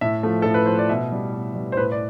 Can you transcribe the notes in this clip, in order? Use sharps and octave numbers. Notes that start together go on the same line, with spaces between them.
A2 E5
F3 A3
A2 A4
B4
F3 A3 C5
D5
B2 E5
G3
B2
G3
C5
A2 B4
D5